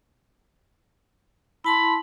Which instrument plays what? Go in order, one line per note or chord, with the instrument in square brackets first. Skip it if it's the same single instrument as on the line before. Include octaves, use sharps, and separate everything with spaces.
[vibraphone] E4 A5 C6 [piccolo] B5